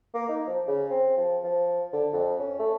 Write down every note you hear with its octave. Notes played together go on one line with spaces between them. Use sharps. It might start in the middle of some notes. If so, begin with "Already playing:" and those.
A#3
D#4
F3
C#3
C4
F3
F3
D3
F2
C#4
A3